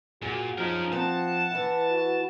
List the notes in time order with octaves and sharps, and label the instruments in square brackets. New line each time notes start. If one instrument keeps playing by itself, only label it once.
[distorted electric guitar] A#2 [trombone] F#4 [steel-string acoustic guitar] G#4
[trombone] F3 [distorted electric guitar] C#4 A#4 [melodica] D#4
[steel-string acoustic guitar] C4 [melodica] F#5 [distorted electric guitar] A5
[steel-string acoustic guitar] E3 E4
[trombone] F#4